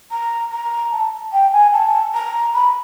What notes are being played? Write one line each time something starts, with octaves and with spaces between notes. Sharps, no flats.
A#5
A#5
A5
G5
G#5
A5
A#5
B5